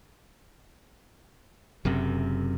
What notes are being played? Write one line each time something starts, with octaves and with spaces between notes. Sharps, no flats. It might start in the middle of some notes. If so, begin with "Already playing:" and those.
F#1 F#2 C3